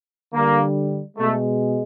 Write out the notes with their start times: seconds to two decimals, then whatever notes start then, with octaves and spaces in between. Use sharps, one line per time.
0.34 D3 G3 A#3
1.17 B2 G#3 A3